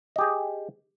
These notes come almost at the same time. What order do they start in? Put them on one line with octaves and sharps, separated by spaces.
D#5 G4 G#4